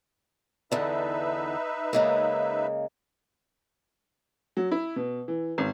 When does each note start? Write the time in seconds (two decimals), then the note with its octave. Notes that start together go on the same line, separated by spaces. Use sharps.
0.72 E2 D3 D#4 B4 E5
1.93 C#3 G#3 A#3
4.57 F#3
4.72 E4
4.96 B2
5.28 E3
5.58 G#1